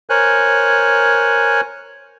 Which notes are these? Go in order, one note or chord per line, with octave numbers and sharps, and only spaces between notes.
A#4 C5 C#5 G#5 F#6